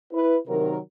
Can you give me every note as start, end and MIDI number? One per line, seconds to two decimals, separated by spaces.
0.12 0.36 64
0.12 0.36 71
0.48 0.77 48
0.48 0.77 51
0.48 0.77 54
0.48 0.77 70